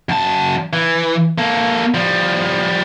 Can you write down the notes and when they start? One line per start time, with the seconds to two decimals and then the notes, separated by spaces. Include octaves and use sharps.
0.09 F#2 A5
0.73 E3
1.38 A#3 A4
1.94 F3 G3